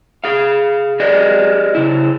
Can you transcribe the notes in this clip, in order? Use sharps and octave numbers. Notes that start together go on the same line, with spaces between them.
G#4 F5
G4 G#4 B4 D5 D#5
C#3 E4